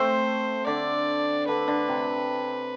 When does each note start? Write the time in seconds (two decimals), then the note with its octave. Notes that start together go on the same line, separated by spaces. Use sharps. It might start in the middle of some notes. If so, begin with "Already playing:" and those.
Already playing: A3 C4 C5
0.66 D3 D5
1.48 D3 B4
1.68 D3
1.88 C3